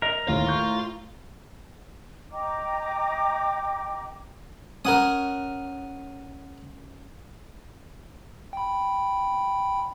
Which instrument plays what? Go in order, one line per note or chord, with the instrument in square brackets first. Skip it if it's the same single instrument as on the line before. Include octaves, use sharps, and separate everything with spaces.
[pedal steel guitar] A#4 [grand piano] D#5 A#6
[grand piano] D#2 [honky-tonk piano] A2 [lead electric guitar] F4 F5
[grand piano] C#6 G6
[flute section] D#5 G5 A#5 D6
[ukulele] C#4 [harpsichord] A#4 F#5 D#6
[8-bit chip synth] G5 B5